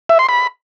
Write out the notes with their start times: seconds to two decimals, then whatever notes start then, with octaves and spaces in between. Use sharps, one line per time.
0.09 E5
0.19 C6
0.29 B5